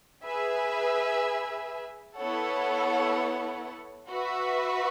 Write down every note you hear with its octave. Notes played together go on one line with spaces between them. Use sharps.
G#4 B4 E5 G#5
B3 E4 A4 C#5 F#5
F#4 B4 E5